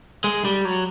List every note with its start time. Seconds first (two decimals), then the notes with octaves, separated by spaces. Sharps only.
0.24 G#3
0.45 G3
0.65 F#3